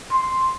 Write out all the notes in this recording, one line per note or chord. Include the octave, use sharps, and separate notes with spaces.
C6